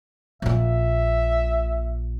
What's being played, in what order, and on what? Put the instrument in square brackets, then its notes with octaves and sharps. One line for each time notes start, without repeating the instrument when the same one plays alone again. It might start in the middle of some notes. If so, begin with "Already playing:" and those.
[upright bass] A#1 A#2 [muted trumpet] E5